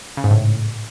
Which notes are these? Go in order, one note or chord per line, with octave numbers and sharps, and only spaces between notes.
C#3
G#2
A2